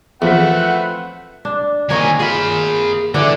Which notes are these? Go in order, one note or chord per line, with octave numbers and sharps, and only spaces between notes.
E2 F3 A3 C4 F4 B4 F#5 B6
D4
D#3 A#3 C#5 D#5 G#5
F4 G#4 B5
D3 E3 D4